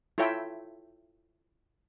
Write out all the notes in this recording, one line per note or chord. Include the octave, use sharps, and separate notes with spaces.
E4 F4 A4 C#5 E5 G5